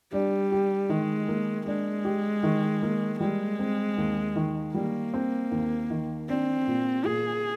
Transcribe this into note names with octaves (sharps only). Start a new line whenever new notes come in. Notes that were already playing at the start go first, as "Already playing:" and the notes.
G3 D4
G4
D#3 G#3
A#3
G#3 D4
G4
D#3
A#3
G3 G#3
C4
D#2
D#3
G3 A#3
C4
D#2
D#3
C4 D4
A#2
A#2 G#4